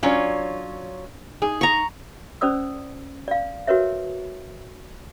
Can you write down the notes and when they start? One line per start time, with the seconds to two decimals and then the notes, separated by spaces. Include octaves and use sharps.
0.03 F#3 C#4 D4 F4 D5
1.42 D#4 G#4
1.61 A#5 C#6
2.41 C#4 C5 D5 D#6 E6
3.28 D5 F5
3.67 F#4 A#4 B4 C#5 E5